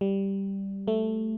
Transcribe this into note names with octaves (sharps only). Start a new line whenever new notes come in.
G3
A3